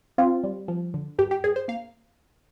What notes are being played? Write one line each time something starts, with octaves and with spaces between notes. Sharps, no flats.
C4 F4
G3
F3
D3
G2 G4
G4
G2 G#4
C5
A#3 F5